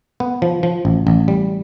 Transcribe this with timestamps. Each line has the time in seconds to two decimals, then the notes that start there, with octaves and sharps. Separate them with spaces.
0.20 B3
0.42 F3
0.63 F3
0.85 A1
1.07 A1
1.28 G3